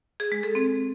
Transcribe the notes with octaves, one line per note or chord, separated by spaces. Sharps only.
G#4
G#3
A4
C4